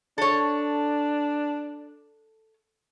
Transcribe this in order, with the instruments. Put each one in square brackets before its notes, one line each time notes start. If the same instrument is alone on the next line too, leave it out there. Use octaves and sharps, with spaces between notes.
[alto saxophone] D4 [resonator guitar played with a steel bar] A4 C#5